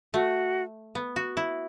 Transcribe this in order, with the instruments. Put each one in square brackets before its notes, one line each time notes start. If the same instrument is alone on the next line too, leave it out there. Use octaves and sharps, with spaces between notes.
[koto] A3 [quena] F#4
[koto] B3
F#4
E4